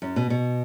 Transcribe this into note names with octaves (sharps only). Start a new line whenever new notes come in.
F#2
B2
B2